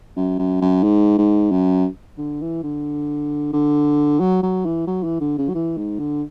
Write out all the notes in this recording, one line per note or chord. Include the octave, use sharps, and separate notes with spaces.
F#2
F#2
F#2
G#2
G#2
F#2
D3
E3
D3
D3
F#3
F#3
E3
F#3
E3
D3
C#3
F#3
E3
G#2
D3